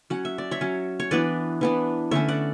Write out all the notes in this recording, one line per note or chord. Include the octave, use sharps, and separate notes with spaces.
F#3 C#4 F#5
E5
D5
C#5 E5
F#3 C#4
C#5
E3 B3 D4 B4 D5
E3 B3 D4
D3 A3 C#4 C#5 E5
D5 F#5